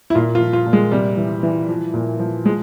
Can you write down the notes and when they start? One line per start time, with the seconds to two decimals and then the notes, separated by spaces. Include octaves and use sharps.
0.10 E4
0.15 A#2 F4
0.35 F4
0.41 F3
0.53 F4
0.66 A#2
0.73 G#3
0.91 C3 G3
1.17 E3
1.43 E3
1.68 F3
1.94 A#2
2.19 F3
2.45 F3 G#3